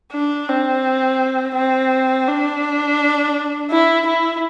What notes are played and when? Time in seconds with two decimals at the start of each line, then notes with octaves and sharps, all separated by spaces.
0.12 D4
0.48 C4
1.55 C4
2.27 D4
3.71 E4
4.06 E4